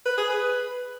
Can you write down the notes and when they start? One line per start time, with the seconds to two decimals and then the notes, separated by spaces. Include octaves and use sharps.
0.06 B4
0.18 G#4
0.30 B4